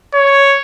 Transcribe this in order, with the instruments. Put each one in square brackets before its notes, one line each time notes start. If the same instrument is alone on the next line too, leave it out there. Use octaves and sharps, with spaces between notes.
[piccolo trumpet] C#5